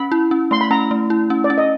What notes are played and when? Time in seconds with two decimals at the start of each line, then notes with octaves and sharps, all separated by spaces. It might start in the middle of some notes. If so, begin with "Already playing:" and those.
Already playing: C#4 B5
0.12 E4
0.31 C#4
0.51 A3 C6
0.61 B5
0.71 C#4 A#5
0.91 A3
1.10 E4
1.30 C#4
1.44 D5
1.50 C#4
1.58 D#5